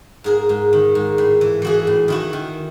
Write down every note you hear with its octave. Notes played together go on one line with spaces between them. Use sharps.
G#2 G#4 A#4
G#2
D#3
G#2
A2
E3
E3 F#4 G#4
A2
D#3 E4 F#4
D#3